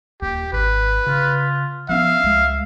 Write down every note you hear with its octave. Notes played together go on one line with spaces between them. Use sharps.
D#1 D#2 G4
G#1 B4
C#3 F4
F3 B3 C#4 E5 F5
C#2 G#3